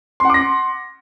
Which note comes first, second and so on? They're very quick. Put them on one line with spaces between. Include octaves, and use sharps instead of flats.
C6 F#5 D6 A#6